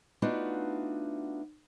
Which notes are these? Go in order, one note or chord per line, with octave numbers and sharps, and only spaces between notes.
A3 B3 D4 D#4 F4 F#4